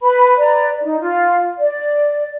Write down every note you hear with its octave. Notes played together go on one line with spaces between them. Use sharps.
B4 B5
B4 D5 A#5
D#4
F4
D5